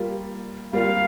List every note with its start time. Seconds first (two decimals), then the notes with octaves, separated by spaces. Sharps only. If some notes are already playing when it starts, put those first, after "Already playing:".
Already playing: G3 A#3 F4
0.72 G3 A#3 F4 F5